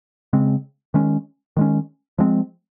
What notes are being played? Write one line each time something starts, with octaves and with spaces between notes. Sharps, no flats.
C#3 G#3 C4
D#3 G#3 C#4
D#3 G#3 C#4
F3 G#3 C4